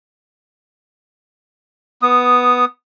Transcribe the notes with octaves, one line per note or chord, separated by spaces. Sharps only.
B3 D#6